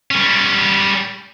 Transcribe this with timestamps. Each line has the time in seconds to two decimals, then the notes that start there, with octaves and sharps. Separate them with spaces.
0.11 G3 C#4